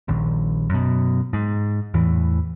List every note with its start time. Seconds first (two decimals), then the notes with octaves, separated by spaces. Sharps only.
0.08 D#1 A#1 D#2
0.70 F#2 B2
1.33 G#2
1.94 E2 A2 E3